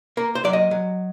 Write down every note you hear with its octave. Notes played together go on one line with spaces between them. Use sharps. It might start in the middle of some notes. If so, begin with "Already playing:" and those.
A#3 A#4
C5
F#3 D5
D#5
F#3